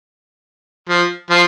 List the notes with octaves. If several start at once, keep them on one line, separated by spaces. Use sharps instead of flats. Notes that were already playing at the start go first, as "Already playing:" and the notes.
F3
F3